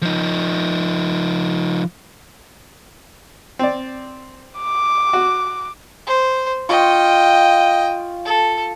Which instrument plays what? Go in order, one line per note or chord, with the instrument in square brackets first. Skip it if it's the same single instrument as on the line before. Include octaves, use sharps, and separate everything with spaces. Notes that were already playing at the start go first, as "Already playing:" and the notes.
[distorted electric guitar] F3 D#4
[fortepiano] C4 D5
[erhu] D6
[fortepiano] F#4
[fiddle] C5
[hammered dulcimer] F4 C#6 [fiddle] D#5 G5
[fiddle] A4